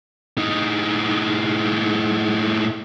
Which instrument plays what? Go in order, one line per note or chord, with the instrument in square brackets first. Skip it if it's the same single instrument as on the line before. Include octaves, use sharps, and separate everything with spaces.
[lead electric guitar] A2 D#4